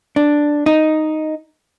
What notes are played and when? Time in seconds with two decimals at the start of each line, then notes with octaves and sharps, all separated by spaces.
0.16 D4
0.66 D#4